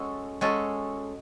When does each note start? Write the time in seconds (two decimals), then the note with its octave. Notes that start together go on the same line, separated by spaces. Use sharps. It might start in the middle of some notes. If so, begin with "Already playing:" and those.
Already playing: G#3 C#4 F#4 A4
0.41 G#3 C#4 F#4 A4